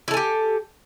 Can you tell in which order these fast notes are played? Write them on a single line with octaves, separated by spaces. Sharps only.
E4 A4 G#5 G4